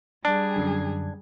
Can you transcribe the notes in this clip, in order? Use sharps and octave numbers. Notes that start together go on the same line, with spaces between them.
G3 D4 G#4
F#2 D3 G#6